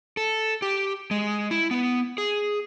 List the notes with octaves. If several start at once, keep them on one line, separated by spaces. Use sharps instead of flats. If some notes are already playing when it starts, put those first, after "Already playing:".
A4
G4
G#3
E4
B3
G#4